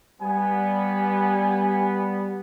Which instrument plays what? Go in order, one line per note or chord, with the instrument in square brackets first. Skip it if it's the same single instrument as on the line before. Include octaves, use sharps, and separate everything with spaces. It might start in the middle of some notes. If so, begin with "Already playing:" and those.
[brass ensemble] G3 B3 [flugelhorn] G#5